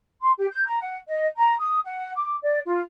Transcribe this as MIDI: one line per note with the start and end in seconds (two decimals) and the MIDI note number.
0.21 0.32 84
0.38 0.46 67
0.51 0.63 91
0.65 0.78 82
0.79 0.96 78
1.07 1.26 75
1.37 1.54 82
1.59 1.78 87
1.84 2.13 78
2.16 2.36 86
2.42 2.59 74
2.66 2.79 65